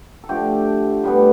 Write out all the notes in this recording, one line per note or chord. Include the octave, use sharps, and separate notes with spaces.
A4
D3 F3 A3 G4
A2 G3 B3